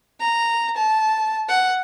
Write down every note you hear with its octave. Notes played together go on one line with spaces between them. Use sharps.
A#5
A5
F#5